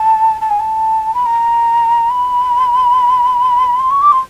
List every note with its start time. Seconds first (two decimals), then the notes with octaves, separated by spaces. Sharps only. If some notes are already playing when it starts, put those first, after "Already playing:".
Already playing: A5
0.41 A5
0.50 G#5
0.60 A5
1.14 B5
1.26 A#5
2.10 B5
3.80 C6
3.91 C#6
4.02 D6
4.12 C6